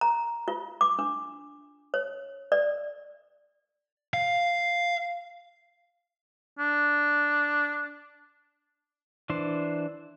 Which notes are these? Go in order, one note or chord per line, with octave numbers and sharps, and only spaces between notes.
A#5
F4
D6
D4
C#5
D5
F5
D4
E3 D4 C5